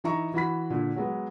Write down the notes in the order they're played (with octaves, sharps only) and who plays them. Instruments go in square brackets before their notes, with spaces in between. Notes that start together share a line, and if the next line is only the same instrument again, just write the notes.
[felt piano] E3 D#4 E5 A#5 C#6
E3 F#4 B5 B6
A#2 D3
F#3 G#3 B3